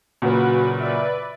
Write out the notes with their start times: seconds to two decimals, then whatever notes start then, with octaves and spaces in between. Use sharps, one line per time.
0.22 A#2 C#3 F#3 F#4 B4
0.80 B4 D5 E5